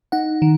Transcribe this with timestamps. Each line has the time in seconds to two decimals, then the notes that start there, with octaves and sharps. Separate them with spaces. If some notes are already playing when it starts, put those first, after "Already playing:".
0.12 D#4 F#5
0.42 D#3